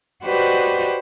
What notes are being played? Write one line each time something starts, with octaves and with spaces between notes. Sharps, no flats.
F#4 G4 B4 C5 D5 D#5